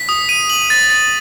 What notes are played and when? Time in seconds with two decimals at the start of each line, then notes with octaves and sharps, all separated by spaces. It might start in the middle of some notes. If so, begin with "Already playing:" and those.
Already playing: B6
0.09 D#6
0.29 D#7
0.50 F#7
0.70 A6
0.90 A6